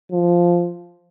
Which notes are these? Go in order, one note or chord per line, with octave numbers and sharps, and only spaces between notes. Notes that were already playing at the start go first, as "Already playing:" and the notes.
F3